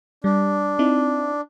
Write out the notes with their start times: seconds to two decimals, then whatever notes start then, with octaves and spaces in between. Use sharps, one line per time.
0.24 G3 D4
0.79 C4 D#4 E4